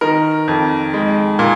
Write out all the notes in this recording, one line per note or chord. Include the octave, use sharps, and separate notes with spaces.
D#3 A#4
F2
G#3
A#2